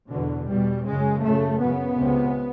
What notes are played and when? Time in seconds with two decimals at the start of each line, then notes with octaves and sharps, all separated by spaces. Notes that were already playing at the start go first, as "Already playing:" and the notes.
0.10 E2 B2 D3
0.48 E2 B2 G3
0.86 F#2 C#3 G#3
1.22 F#2 C#3 A3
1.60 F#2 C#3 B3
1.98 C#2 C3